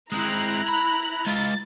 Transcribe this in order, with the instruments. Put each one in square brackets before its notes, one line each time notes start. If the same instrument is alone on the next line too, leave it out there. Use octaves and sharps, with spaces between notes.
[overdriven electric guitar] G#3 C4 [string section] E4 A#5 F#6
[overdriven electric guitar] B5
[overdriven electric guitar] G#3 F4 [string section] A6